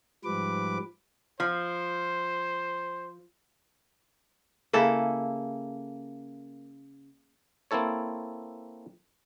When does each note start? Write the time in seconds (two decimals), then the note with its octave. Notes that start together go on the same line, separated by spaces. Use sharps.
0.24 G#2 F3 G3 B4 D6
1.40 F3 C5
4.73 C#3 A#3 E4 A4
7.71 A#3 C4 E4 A4 C#5